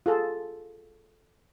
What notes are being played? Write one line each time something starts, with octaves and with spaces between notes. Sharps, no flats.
F4 G#4 A4